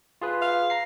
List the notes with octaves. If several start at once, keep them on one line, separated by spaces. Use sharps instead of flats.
F4 G#4 B4
F5
A#5 C7